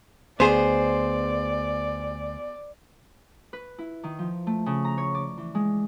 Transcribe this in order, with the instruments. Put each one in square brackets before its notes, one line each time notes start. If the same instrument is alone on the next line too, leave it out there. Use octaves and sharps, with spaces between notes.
[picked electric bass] D2 [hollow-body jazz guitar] B3 G#4 [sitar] C5 [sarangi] D5
[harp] B4
E4
D#3
F3
A3
C#3
A#5
C#5
D5
E3
G#3